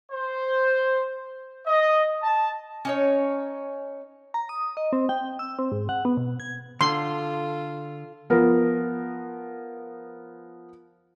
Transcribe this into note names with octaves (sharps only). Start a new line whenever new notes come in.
C5
D#5
A5
C#4 D#4 C#5
A#5
D#6
D#5
C4
G5
E6
C4
G#2
F#5
B3
B2
G#6
D3 F4 A4 C6
F3 B3 A#4